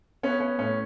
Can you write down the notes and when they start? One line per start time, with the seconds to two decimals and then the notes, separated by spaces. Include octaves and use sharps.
0.23 B3 C#4
0.40 C#4
0.59 A2 C#4